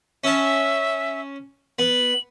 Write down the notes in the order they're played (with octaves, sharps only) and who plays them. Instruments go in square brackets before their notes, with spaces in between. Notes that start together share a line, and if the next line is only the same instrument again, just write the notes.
[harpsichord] C#4 A5 [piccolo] E5
[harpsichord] B3 [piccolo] F#7